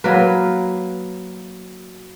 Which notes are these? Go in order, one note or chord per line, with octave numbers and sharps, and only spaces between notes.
F#3 A#3 A#4 B4